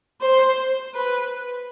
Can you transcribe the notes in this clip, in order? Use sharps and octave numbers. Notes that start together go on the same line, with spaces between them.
C5
B4